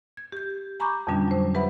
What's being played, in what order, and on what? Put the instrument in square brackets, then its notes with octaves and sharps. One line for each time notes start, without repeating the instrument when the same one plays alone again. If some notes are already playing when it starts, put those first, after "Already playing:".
[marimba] G#6
G4 G6
G#5 A#5 B5 C#6 D6 G6
F2 B2 D3 G3 C#4 D4
F#3 C5
G4 B4 E5 F#5 B5